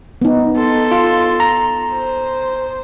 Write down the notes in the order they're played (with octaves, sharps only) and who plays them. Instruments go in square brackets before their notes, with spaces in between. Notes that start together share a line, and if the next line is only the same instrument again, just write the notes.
[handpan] B3 D#4
[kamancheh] A4 C6
[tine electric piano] F4
A#5
[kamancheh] C5